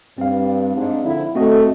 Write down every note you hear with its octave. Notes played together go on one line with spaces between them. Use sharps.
G2 C4 F5
G#2 D4
D3 F3 E4
A3 C4 F#4 D#5